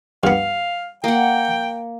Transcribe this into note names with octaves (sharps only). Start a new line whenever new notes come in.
G2 B3 F5
A#3 F#5 G5